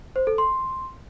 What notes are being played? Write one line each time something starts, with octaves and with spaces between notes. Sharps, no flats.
C5
A4
C6